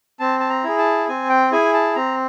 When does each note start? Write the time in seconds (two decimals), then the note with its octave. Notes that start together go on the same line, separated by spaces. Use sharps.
0.20 C4 A5
0.40 A5
0.49 A#5
0.64 E4 G#4
0.79 A5
1.08 C4 G#5
1.30 G5
1.52 E4 G#4 G#5
1.74 A5
1.96 C4 A#5